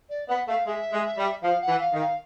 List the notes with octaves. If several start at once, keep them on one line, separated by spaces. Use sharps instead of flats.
D5
B3 F#5
A3 F5
G#3 E5
G#3
G3
F3 F5
F#5
E3
F5
D#3
F5